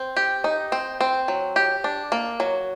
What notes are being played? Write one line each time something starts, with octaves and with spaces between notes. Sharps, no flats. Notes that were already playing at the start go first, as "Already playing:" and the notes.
Already playing: C4
G4
D#4
C4
C4
F#3
G4
D4
A#3
F#3